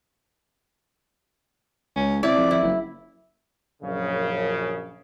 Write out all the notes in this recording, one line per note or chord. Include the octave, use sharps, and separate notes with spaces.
C#2 C#4
C3 E4 D5
F2
E4
F#1
A#1 F#2 C#3